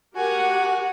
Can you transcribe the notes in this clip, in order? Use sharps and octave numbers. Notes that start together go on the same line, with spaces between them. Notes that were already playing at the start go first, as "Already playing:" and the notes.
F#4 G4 A#4 F#5 G#5